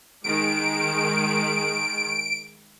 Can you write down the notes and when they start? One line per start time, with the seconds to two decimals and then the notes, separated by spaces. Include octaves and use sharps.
0.24 D#3 G#3 D7